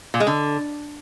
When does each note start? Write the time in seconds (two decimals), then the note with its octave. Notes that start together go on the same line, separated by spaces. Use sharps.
0.14 A#2
0.20 G#3
0.27 D3